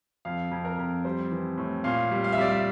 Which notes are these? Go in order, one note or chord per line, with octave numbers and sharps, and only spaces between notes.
F2 F5
F2
A#4
F2
G3 C5
E3
A2
A#2 F5
G3
F5
E5
G3 D5
E5